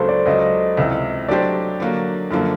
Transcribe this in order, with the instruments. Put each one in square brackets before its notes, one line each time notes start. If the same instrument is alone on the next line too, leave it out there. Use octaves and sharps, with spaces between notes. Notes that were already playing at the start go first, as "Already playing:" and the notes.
Already playing: [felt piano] C#2 C#3 F#3 A#3 D4 [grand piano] A4 C5
[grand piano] D5
[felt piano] C#2 C#3 F#3 [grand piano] D#5
[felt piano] C#2 C3 E3
[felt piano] F#3 A3 D4 G4 C5 [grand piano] D5
[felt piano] D3 F#3 A#3
F#2 D3 F3 A#3